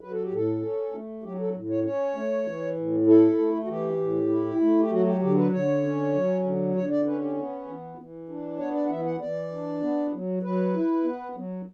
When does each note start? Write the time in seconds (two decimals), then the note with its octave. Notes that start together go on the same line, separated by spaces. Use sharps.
0.01 F#3 B4
0.11 A4
0.23 G4
0.31 A2 A4
0.62 C#4
0.92 A3
1.23 F#3 G4
1.39 A4
1.54 A2
1.70 C#5
1.84 C#4 C#5
2.15 A3
2.45 E3
2.77 A2
3.07 E4 A4
3.38 A3
3.64 F#4
3.68 E3 G4
4.00 A2
4.30 E4
4.61 A3
4.80 G4
4.91 F#3 F#4
5.06 G4
5.22 D3 G4
5.37 B4
5.52 D3 C#5
5.84 C#4
6.14 F#3
6.44 D3
6.75 D3 C#5
6.91 D5
7.06 C#4 B4
7.21 G4
7.37 B3
7.68 E3
7.98 E3
8.29 D4
8.59 B3 C#5
8.74 D5
8.86 F#5
8.89 E3 E5
9.06 F#5
9.20 E3 D5
9.52 D4
9.82 B3
10.13 F#3
10.43 F#3 B4
10.74 E4
11.04 B3
11.35 F#3